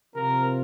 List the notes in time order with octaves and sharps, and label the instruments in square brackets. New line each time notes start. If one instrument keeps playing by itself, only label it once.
[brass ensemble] C3 F3 C4 F4 A#4